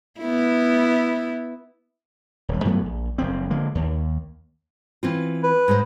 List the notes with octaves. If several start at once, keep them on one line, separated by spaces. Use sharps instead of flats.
B3 E4
D#1 G2
G2 F#3 A3 B3
A#1
F#1 F3 C4
D3 F3 G#3 A#3
D#2
E3 C4 F4
B4
G#2 G#3 C5